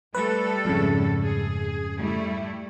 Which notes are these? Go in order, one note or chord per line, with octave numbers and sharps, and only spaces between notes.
G3 A3 A4 B4
F2 G#2 C#3
G#4
G3 A3 E4